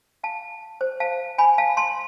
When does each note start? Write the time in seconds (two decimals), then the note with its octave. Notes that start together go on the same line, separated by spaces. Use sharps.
0.23 F5 A5
0.81 C5
1.00 F5 A5
1.38 G#5 B5
1.58 F5 A5
1.77 A5 C6